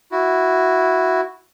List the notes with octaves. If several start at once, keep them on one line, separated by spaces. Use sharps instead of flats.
E4 F#4